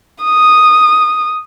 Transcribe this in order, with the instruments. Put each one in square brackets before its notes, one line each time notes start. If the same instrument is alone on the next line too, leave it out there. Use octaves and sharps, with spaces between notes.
[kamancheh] D#6